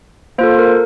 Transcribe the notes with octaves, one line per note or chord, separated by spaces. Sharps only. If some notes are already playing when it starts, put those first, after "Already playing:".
A#3 F4 A4 C5
A#4